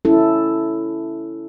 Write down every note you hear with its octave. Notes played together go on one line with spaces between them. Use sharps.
C#4 E4 A4